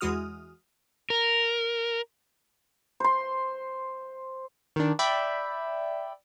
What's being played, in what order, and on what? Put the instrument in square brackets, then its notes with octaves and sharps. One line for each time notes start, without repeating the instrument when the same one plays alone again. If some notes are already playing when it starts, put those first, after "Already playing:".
[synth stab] E2 E3 G#3 F#4 D#6 F6
[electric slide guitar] A#4
[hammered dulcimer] C5 C6
[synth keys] D#3 D4
D5 E5 G5 B5